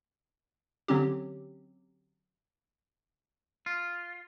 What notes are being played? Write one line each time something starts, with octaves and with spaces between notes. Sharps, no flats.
D3 F#3 C4 C#4 G4
F4